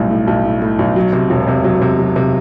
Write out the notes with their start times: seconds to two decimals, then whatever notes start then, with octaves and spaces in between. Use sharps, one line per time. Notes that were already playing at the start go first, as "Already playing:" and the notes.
Already playing: B1 A2 G3
0.11 A2
0.27 B1
0.45 A2
0.62 A2
0.79 B1
0.96 F#3
1.13 C3
1.30 E1
1.48 C3
1.64 F#3
1.82 C3
1.99 F#3
2.16 C3